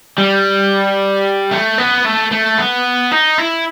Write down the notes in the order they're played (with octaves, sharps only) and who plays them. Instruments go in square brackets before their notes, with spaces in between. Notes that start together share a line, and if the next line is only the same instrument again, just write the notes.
[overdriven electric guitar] G3
A3
B3
A3
A3
B3
D#4
E4